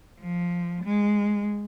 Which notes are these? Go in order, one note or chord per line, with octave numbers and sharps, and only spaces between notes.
F3
G#3